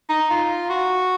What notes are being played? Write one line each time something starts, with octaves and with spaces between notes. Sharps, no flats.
D#4
F4
F#4